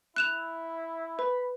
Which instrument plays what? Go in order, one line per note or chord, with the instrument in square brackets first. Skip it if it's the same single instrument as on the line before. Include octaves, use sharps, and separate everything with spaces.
[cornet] E4 [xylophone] F#6 E7 F7
[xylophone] B4 [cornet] B5